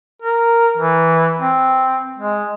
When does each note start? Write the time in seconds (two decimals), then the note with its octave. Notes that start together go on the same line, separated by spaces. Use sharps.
0.22 A#4
0.77 E3
1.39 C4
2.18 G#3